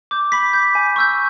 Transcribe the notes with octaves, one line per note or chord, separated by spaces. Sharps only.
D6 G6
B5 B6
D6 G6
G#5
C#6 E6 G6